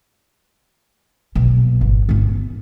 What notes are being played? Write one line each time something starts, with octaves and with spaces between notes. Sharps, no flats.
B1 A#2
G#1 E3
G#1 C#4
B3